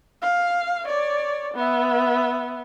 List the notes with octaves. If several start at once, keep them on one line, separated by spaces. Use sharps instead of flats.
F5
C#5 D5
B3 E5